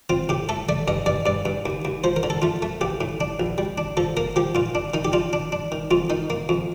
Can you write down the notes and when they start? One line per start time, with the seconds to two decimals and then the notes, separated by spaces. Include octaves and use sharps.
0.10 C4 F4
0.29 A2 G4
0.49 A3 A4
0.69 A3 D5
0.88 G2 D#5
1.06 G2 D5
1.26 G2 D5
1.45 G2
1.66 D#2
1.85 D#2
2.04 F3 C5
2.16 A#4
2.23 D3
2.30 A4
2.42 A3 F4
2.62 A3
2.81 A1 G4
3.01 A2
3.20 D4
3.40 A#1
3.58 G3
3.78 D4
3.97 F3 A4
4.17 A#3 A#4
4.36 F3 G4
4.55 A#2 F4
4.75 D4
4.94 D#3 D#4
5.05 G4
5.13 D4 F4
5.33 D4
5.52 D4
5.72 D#3
5.91 F2 F4
6.10 D#3 D#4
6.30 A#3
6.49 F2